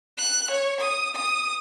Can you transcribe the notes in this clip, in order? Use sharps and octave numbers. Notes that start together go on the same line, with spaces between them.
F#6
C#5
D#6
D#6